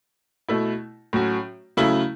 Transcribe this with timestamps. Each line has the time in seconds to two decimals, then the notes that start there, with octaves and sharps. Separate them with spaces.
0.49 B2 A3 E4
1.13 A2 F#3 C#4 F#4
1.77 C#3 F#3 A3 E4